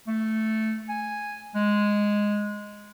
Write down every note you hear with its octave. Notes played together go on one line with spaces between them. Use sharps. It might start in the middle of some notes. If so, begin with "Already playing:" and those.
A3
G#5
G#3